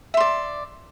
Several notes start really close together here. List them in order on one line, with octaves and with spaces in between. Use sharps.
E5 C6 D5